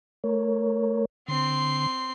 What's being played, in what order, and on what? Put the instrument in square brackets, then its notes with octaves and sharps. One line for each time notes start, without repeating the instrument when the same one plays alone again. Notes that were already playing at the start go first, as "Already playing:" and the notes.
[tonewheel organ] A3 A#4 C#5
[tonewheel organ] D3 [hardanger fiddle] C4 C6